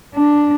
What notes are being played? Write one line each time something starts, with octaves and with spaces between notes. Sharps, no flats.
D4